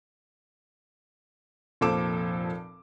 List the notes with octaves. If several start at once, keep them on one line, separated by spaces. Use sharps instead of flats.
F1 A#2 F3 A4 D6 E7